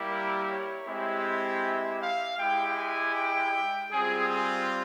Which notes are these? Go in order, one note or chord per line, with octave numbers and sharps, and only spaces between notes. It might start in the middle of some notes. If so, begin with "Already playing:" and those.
Already playing: G3 A#3 E4 G4
A#4
C#5
G#3 C4 E4 G4 E5
E5
F5
G#3 E4 G4 G5
G#5
G5
G3 C4 F4 G#4
G#4